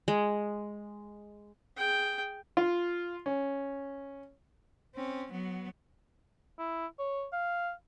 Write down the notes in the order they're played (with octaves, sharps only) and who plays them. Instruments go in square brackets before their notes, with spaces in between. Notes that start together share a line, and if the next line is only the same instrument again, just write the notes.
[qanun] G#3
[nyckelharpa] G#4 G5
[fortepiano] F4
C#4
[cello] C4 C#4
F#3 B3
[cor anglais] E4
C#5
F5